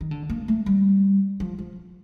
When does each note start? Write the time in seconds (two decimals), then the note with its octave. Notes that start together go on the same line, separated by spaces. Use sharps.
0.01 D#3
0.11 D3
0.30 A#3
0.48 A3
0.66 G3
1.40 F3
1.59 F3